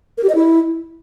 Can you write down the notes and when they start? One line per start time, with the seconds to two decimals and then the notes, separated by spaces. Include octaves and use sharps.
0.18 A#4
0.23 G4
0.29 D#5
0.35 E4